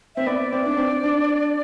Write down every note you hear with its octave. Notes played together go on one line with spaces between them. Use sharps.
C4 E5
B3 D5
C4
D4
C4
D4